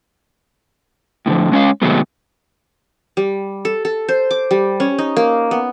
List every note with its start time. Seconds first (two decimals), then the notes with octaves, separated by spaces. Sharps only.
1.26 A2 D3 E3 F3
1.52 G#3 C#4 C#5 F5
1.82 C3 D#3 F#3 G#3 A3 B3
3.17 G3
3.65 A4
3.85 A4
4.09 C5
4.31 D6
4.51 G3
4.80 C#4
4.98 D#4
5.17 A#3
5.51 B3